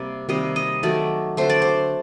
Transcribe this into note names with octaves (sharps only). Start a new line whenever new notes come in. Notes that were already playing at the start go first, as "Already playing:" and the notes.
Already playing: C3 G3 A#3 D5
C3 D#3 G3 A#3 D#5
D#5
D#3 F#3 A3 D5
D3 A3 C5
D5
C5